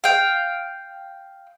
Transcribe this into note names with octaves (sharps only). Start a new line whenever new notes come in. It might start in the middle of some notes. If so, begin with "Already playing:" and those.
F5 G5